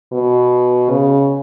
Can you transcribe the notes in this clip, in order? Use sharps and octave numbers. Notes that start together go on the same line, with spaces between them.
B2
C#3